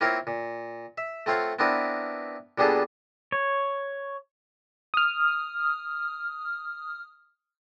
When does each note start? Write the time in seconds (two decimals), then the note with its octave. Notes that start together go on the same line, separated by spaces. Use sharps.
0.01 A#3 C4 E4 F4 A#4 C#5
0.27 A#2
0.98 E5
1.26 A3 C4 F4 C#5 F5 F#5
1.59 B3 C4 D4 E4 A#4 B4
2.58 A#2 G3 B3 D4 G#4 A4
3.32 C#5
4.94 D#6 F6